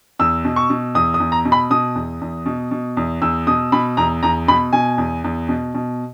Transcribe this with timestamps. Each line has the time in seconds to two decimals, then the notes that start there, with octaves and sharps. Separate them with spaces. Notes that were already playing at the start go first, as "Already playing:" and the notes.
0.19 E2 E6
0.45 B2
0.56 C#6
0.70 B2
0.95 E2 D#6
1.14 D#6
1.20 E2
1.32 A#5
1.45 B2
1.52 B5
1.70 B2 D#6
1.95 E2
2.21 E2
2.46 B2
2.71 B2
2.97 E2
3.22 E2 E6
3.47 B2 D#6
3.72 B2 B5
3.97 E2 A#5
4.23 E2 A#5
4.48 B2 B5
4.73 B2 G#5
4.98 E2
5.24 E2
5.49 B2
5.74 B2